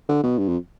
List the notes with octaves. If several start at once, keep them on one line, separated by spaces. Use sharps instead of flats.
D3
B2
G2
F2